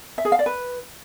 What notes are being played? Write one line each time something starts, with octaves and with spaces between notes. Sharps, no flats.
E5
G#4
F5
D5
B4